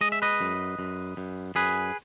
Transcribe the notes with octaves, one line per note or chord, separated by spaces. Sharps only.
G#3 D#5
E5
B4 D#5
F#2
F#2
F#2
F#2 G#4 B4